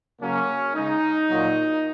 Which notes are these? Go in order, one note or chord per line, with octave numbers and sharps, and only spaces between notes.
C#3 F#3 A#3 C#4
C#3 G#3 D#4
A#2 F#3 A#3